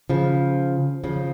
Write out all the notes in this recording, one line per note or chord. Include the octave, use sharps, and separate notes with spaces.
C#3 F3
C#3 F3